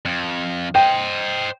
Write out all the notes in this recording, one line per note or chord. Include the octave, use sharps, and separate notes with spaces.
F2
C5 D#5 G5